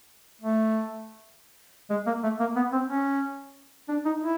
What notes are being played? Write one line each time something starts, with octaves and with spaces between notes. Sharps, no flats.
A3
G#3
A#3
A3
A#3
B3
C4
C#4
D4
D#4
E4